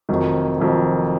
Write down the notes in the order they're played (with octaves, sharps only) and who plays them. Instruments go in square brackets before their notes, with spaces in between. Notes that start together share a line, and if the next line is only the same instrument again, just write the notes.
[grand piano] F1 F2 D#3 F#3
F1 F2 D#3 F#3